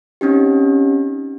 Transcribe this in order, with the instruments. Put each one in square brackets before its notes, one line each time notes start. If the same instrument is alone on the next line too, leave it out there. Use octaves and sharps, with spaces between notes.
[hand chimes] C4 C#4 D#4 G4